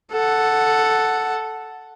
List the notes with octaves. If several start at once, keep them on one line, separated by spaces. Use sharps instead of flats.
A4 F#5